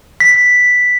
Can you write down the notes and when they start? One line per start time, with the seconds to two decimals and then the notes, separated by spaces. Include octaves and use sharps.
0.20 B6